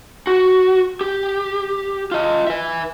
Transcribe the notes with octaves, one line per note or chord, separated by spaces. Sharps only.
F#4
G4
F4 D#5
B4 E5